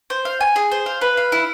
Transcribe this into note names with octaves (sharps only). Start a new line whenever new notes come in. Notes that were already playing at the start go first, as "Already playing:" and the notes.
C5
F5
G#5
G#4
C5
F5
B4
F5
E4